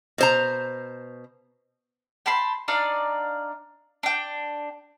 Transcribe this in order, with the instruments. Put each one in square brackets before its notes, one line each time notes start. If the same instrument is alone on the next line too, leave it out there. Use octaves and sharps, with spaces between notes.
[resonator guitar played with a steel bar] B2 C5 A#5
[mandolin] G5 A5 B5 C6
D4 D#4 D5 F5
D4 G5